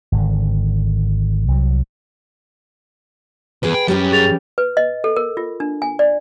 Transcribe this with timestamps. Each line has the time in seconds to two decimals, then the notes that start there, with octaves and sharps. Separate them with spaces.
0.12 G#1 D3
1.48 C2 F#3
3.63 E2 G#4 B4
3.75 G5
3.88 F#2 G3 C#4 G4
4.12 G#4 A6 F7
4.58 B4
4.77 D#5
5.04 A4
5.17 A#4
5.37 F4
5.60 D4
5.82 G#5
5.99 D5